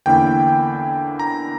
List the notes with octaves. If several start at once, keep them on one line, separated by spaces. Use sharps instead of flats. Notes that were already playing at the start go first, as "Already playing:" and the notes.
E2 D3 A#3 C#4 E4 G5
A#5